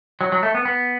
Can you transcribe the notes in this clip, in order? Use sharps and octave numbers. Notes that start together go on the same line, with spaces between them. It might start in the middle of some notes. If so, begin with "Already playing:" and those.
F#3
F#3
A3
B3
B3